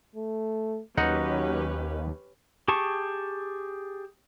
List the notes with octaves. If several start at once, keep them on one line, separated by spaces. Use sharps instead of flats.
A3
D#2 F#3 C#4 D#4 G4 B4 F#5
G4 G#4 A5 C#6